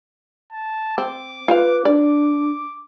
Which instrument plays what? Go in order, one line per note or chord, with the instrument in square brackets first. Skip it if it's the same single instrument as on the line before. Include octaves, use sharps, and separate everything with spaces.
[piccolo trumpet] A5
[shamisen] C4 [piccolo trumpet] D6
[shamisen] F4 C5 F5 [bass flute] B4
[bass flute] D4 [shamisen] D5 [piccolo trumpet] D6